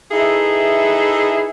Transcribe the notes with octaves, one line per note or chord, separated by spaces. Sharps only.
D#4 E4 G#4 A4 B4 E5